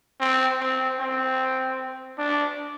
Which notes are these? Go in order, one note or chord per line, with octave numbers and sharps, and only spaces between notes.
C4
C4
C4
D4